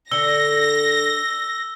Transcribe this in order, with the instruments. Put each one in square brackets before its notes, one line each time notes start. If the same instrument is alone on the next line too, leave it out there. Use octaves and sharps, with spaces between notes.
[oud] D3 A4 [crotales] E6 G7 [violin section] A#6